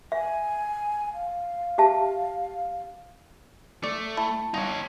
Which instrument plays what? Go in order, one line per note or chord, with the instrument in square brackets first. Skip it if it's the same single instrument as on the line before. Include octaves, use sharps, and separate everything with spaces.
[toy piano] E5 [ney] G#5
[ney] F5
[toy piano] G4 E5 A5
[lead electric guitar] A3 [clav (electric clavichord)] D5
[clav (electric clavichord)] E4 [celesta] A5
[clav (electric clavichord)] G1 [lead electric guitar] D#4 C#5